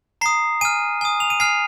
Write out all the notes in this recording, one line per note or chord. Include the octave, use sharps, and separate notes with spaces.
A#5 D#6 C7
G#5 F6 D#7
G#5 D#6
F7
D#7
G#5 F6 C7